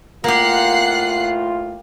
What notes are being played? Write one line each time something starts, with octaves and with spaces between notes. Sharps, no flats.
A2 A#3 F4 G4 F#5 F#6 C7